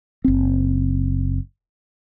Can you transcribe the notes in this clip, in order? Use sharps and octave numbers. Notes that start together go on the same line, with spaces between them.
F#1 C4